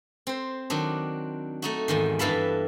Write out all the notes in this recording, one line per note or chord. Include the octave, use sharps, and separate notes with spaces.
C4 C5
D#3 F#3 D4
A3 D#4 F#4
E2 G#2 D#3
G2 E3 A4 F5 A5 B5